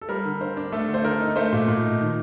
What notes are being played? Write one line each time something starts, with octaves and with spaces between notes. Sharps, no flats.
A4
G3 A#4
D3
D3 C5
D4
A3 A4
D3
C5
D3 A#4
D#4
A3 C5
A#2
A#2
D#4
D#3